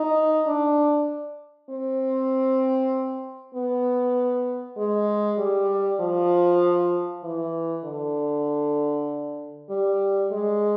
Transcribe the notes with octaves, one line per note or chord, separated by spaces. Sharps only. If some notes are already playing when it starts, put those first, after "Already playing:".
Already playing: D#4
D4
C4
B3
G#3
G3
F3
E3
D3
G3
G#3